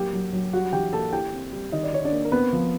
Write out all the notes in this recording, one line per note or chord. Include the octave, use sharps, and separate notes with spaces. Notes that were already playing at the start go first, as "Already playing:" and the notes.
Already playing: F#3 A#3 G4 G5
F#3
F#3
G3 F#4 F#5
E3 G4 G5
A#3 A4 A5
E4 G4 G5
C4
G3
D#3 D#5
D5
D#3 C#5
D4 D5
A#3
A#4
B3 C4 B4
F3